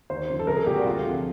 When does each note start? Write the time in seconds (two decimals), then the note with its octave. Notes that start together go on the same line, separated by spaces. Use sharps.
0.10 D#2 C5
0.29 C#3 F3
0.39 A4
0.47 C2 A#4
0.56 G#4
0.66 A#2 G3 G4
0.76 F#4
0.86 D2 F4
1.04 C3 F3